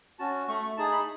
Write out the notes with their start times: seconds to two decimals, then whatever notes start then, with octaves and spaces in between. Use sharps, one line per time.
0.19 C#4 F#4 A5
0.48 A3 C#6
0.63 C#6
0.77 D#4 G#4 A5
0.92 B5